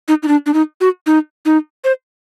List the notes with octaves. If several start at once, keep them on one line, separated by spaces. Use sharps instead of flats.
D#4
D#4
D4
D4
D#4
F#4
D#4
D#4
C5